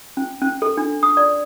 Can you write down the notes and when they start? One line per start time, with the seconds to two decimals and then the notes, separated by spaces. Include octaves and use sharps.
0.17 C#4
0.42 C#4
0.62 A4
0.77 D4
1.03 D#6
1.17 D5